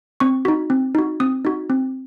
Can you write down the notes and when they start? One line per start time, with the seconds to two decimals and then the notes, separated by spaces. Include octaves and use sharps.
0.20 C4 C#6
0.45 D#4 F#4
0.70 C4
0.95 D#4 F#4
1.20 C4 D#6
1.45 D#4 F#4
1.70 C4